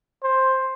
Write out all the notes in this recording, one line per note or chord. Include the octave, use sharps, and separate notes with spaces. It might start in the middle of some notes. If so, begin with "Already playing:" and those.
C5